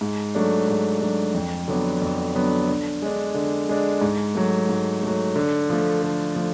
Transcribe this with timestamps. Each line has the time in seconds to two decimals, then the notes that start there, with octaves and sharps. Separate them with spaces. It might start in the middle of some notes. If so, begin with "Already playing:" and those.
0.01 G#2
0.35 F#3 A3 D4
0.68 G#2
1.01 F#3 A3 D4
1.34 F2
1.68 D3 F#3 B3 D4
2.02 F2
2.35 D3 F#3 B3 D4
2.68 D3
3.02 G#3 D4
3.35 D3
3.69 G#3 D4
4.01 G#2
4.35 F#3 A3
4.69 G#2
5.03 F#3 A3
5.36 D3
5.70 F3 A3
6.03 D3
6.36 F3 A3